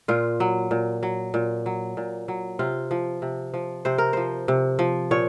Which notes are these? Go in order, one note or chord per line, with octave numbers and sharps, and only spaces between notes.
A#2 F4
F#3
A#2
F#3
A#2
F#3
A#2
F#3
C3 F4
F3
C3
F3
C3 C5
A#4
F3 C5
C3
F3
A#2 C#5